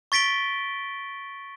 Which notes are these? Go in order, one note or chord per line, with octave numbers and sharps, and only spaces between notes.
C#6 A6 B6 D7 G7